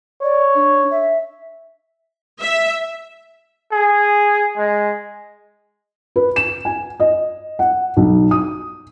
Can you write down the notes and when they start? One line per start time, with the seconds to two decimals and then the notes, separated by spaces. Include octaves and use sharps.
0.23 C#5 D5
0.55 D4
0.90 E5
2.41 E5
3.72 G#4
4.57 G#3
6.16 B4
6.36 E7
6.65 G#5
7.00 D#5
7.59 F#5
7.97 B1
8.31 D#6